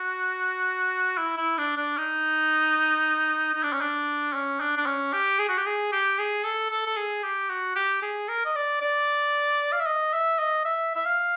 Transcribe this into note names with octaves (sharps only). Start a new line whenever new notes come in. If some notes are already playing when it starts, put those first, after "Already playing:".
Already playing: F#4
E4
E4
D4
D4
D#4
D#4
D4
C#4
D4
C#4
D4
D4
C#4
G4
G#4
F#4
G4
G#4
G4
G#4
A4
A4
A4
G#4
G4
F#4
G4
G#4
A#4
D#5
D5
D5
F5
E5
D#5
E5
D#5
E5
E5
F5